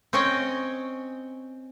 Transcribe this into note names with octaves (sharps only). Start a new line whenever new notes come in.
C4 C#4 C#5 D#5 G5 G#5